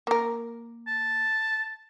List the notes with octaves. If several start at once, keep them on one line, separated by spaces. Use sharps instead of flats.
A#3 A#4
A5